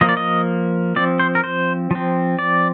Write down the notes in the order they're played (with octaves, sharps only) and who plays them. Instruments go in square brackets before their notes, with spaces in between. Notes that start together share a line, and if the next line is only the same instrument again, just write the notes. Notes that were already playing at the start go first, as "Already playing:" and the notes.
[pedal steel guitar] F3 A#3 D#5
D5
D#5
F3 C4 D5
C5
A#4
C5
F3 C4
D5